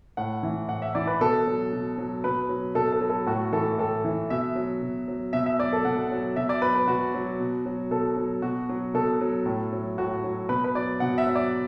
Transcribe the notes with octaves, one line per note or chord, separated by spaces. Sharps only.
A2 F#5
E3
A2 F#5
E5
E3 D5
B4
B2 A4
F#3
B2
F#3
B2 B4
F#3
B2 A4
A4
F#3
A4
A2 F#4
E3 A4
A2 A4
E3
B2 E5
F#3
B2
F#3
B2 E5
E5
F#3 D5
A4
B2 F#5
F#3
B2 E5
D5
F#3 B4
B4
B2 F#4
F#3
B2
F#3
B2 A4
F#3
B2 F#4
F#3
B2 A4
F#3
A2
F#3
A2 F#4
F#3
B2 B4
B4
F#3 D5
B2 F#5
E5
F#3
D5